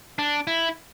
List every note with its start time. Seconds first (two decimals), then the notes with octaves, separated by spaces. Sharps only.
0.19 D4
0.47 E4